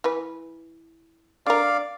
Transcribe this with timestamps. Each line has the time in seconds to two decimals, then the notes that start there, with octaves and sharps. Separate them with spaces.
0.04 E3 B4
1.46 D3 A#4 D5 F5